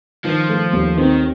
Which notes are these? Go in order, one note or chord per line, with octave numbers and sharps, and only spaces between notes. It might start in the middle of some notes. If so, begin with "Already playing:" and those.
D#3 F3
A3
D#2
D#3 C4